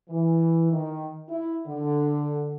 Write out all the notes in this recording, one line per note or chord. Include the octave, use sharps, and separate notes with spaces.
E3
D#3
E4
D3